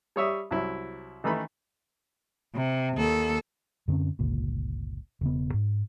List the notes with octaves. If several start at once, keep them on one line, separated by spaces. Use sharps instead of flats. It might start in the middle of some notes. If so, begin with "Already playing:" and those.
G3 C#5 E5 D#6
C2 F#3 E4
D#3 E3 A3 D#4 B5
C3
D#2 A4
F#2 D3 C4 C#4
G1 C#2 A#2
E1 C#3 B3
G#2